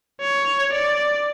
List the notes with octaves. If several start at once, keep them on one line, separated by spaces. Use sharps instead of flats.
C#5
D5